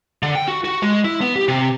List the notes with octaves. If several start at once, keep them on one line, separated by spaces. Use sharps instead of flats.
D3
G5
F#4
F#4
G#3
E4
B3
G4
C3